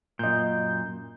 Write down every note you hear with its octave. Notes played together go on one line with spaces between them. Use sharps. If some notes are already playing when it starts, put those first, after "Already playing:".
F#2 A#2 D#5 G6